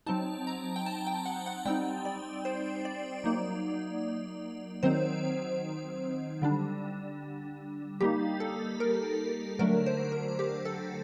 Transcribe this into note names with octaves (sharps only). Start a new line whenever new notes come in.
F#3 C4 D#4 A5
A#5
G5
A5
G5
F#5
F#5
G3 C4 D#4 G5
D5
C5
D5
F#3 A#3 D#4
D#3 F#3 C4 D#4 C5
D3 G3 D4
G3 A#3 D#4 G4
A4
A#4
D3 F#3 A3 D4 A#4
C5
A#4
G4
A4